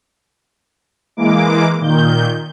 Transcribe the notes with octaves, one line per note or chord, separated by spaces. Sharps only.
E3 G#3 A#3 D6
A#2 D#3 G6